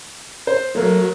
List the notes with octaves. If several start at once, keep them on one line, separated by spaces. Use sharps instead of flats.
C5
F#3 A3 A#3